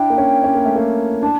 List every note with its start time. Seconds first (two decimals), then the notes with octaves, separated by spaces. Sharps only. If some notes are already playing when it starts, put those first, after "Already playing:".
Already playing: D4 E4 G5
0.10 A#3
0.18 C#4
0.44 C#4
0.55 A#3
0.65 A3
0.76 A#3
1.23 D4 A5